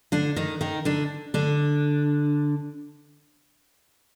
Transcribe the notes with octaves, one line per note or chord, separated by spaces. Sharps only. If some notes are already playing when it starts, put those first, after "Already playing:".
D3 D4
D#3 D#4
D#3 D#4
D3 D4
D3 D4